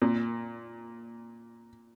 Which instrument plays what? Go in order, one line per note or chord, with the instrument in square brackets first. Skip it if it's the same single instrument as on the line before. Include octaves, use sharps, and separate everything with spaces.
[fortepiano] A#2